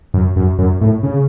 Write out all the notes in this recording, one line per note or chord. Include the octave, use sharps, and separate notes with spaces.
F#2
F#2
F#2
A2
C#3